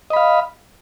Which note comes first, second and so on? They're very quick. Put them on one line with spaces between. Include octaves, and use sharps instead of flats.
D#5 B5 F5